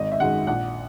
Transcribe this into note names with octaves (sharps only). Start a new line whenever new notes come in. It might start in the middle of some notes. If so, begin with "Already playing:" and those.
Already playing: G#1 D#5
E5
F#2 D#3 G#3 F#5
A#1 F#5